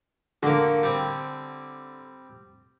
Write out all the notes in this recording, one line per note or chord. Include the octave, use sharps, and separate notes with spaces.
D3 A#3 F#4
G3 C4